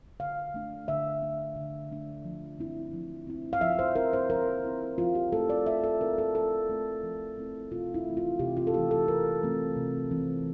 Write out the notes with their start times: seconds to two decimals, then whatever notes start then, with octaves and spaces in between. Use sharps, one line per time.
0.20 D3 F5
0.54 A3 D4
0.88 D3 E5
1.22 A3 D4
1.56 D3
1.90 A3 D4
2.25 F3
2.59 C4 E4
2.93 F3
3.27 C4 E4
3.53 F5
3.61 F3 E5
3.79 C5
3.96 C4 E4 A#4
4.13 C5
4.29 F3 A#4
4.65 C4 E4
4.98 F3 F4
5.15 G4
5.32 A3 C4 E4 A4
5.49 D5
5.66 F3 E5
5.84 A4
6.01 A3 C4 E4 A#4
6.18 A4
6.35 F3 A4
6.69 A3 C4 E4
7.03 F3
7.38 A3 C4 E4
7.72 C3 F4
7.94 E4
8.06 E3 A3 C4
8.17 F4
8.39 C3 G4
8.57 F4
8.67 A4
8.74 E3 A3 C4 G4
8.91 A4
9.08 C3 A#4
9.43 E3 A3 C4
9.76 C3
10.11 E3 A3 C4